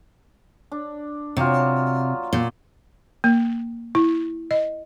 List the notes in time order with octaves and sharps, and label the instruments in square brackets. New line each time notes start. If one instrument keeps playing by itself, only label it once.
[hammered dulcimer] D4
[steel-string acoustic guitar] C3 [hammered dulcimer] F#3 F4
[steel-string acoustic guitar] A#2
[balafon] A#3
E4
D#5